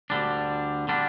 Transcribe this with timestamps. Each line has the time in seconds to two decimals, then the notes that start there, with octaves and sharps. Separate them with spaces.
0.10 D2 D3 G3 D4
0.88 D3 G3 D4